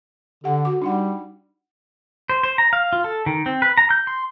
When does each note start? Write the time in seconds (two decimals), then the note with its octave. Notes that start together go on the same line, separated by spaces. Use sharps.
0.44 D3 G4 F#5 A5
0.65 F#4 D6
0.82 G3 D4 D#4 F#5
2.30 C5
2.43 C5
2.58 A#5
2.73 F5
2.93 F4
3.04 A4
3.26 D#3
3.46 C4
3.62 B4
3.77 A#5
3.90 G6
4.07 C6